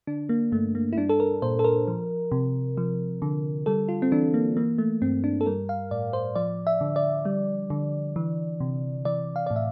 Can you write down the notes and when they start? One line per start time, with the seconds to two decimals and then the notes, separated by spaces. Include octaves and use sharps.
0.07 D3 D4
0.29 A#3
0.52 G2 A3
0.75 A#3
0.93 E4
0.97 G3 D4
1.09 A4
1.20 A#4
1.42 A#2 C5
1.59 A4
1.64 A#4
1.88 F3
2.32 C3
2.77 F3
3.22 D3
3.66 G3 A4
3.89 F4
4.02 C4
4.12 E3 D4
4.34 A#3
4.57 E3 A#3
4.78 A3
5.02 G2 C4
5.24 D4
5.41 A4
5.46 G3 A#4
5.69 F5
5.91 A2 D5
6.13 C5
6.36 F3 D5
6.67 E5
6.81 D3
6.96 D5
7.25 G3
7.70 D3
8.16 E3
8.60 C3
9.05 E3 D5
9.36 F5
9.47 A2 D5
9.56 E5